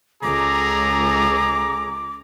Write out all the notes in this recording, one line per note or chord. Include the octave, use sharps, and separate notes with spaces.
C#2 G#4 A4 A#5 D6